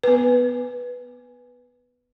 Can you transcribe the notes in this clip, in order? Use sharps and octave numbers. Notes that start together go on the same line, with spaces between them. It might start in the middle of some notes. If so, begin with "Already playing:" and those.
B3 B4